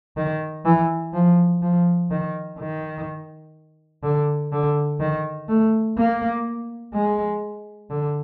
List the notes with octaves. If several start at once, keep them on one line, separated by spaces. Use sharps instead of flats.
D#3
E3
F3
F3
D#3
D#3
D3
D3
D#3
A3
A#3
G#3
D3